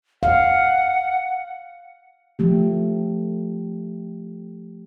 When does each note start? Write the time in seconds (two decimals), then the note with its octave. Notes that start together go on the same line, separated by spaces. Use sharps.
0.23 F5 F#5
2.39 F3 A3 G4